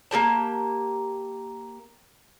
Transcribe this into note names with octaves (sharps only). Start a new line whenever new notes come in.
A#3 D4 G4 A5